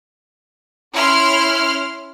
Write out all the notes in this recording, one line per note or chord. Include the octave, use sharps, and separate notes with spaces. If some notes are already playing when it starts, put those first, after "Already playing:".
C#4 E4 C6 F6